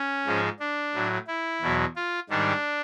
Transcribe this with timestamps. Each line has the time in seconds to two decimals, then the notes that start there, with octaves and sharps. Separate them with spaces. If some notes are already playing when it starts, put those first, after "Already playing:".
Already playing: C#4
0.26 G#2 F3 G#3
0.60 D4
0.94 A2 F#3
1.27 E4
1.62 E2 B2 F#3
1.96 F4
2.29 G#2 D#3 G3 D4